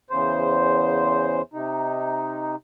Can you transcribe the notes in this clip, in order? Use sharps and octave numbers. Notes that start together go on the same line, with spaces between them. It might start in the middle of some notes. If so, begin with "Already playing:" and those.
E2 C#3 C5
C3 D#4